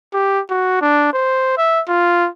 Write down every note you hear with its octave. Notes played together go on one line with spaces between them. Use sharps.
G4
F#4
D4
C5
E5
F4